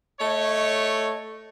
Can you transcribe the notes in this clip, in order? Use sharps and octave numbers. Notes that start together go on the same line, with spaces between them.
A3 C#5 D#5